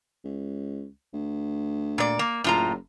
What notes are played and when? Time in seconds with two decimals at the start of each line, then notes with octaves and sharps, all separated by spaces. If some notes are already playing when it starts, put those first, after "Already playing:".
0.24 C#2
1.13 D2
1.98 A#2 D5
2.19 A#3
2.44 F#1 A2 F4 A#5